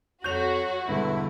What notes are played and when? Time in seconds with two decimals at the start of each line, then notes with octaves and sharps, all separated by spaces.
0.24 F2 F#3 F#4 G6 F7
0.89 E1 G2 D3 E4 B4